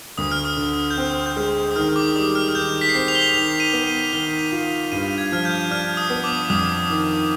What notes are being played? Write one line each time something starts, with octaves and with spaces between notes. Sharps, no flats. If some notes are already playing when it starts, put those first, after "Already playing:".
D2 D#6
F6
D#6
D3
G6
C4 F6
G6
G#3 F6
D#6
D#3 F6
D6
G3 D#6
F6
D#3 G6
B6
C7
C4 B6
F7
G7
F7
D#3 F7
D#7
B3
D#7
D#3 G7
F7
F4
G2 D#7
G#6
F3 F6
G6
D4 F6
D#6
B3
D6
F2 D#6
D#3